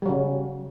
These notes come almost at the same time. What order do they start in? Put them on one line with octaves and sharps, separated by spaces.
G3 F#3 C#3